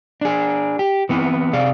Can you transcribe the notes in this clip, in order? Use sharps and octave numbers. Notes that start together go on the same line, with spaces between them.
D4 G#4
G4
E3 B3 C4 E4
C3 G#4 D5 F5